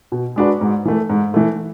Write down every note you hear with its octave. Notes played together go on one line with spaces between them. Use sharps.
B2
G#3 D4 F#4 B4
G#2
E3 A3
G#2
E3 A3